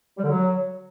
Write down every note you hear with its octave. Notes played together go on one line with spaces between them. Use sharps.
G3
D3
F#3